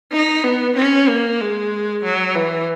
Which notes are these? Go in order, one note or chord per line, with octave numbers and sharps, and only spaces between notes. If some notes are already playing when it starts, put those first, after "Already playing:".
D#4
B3
C#4
A#3
G#3
F#3
E3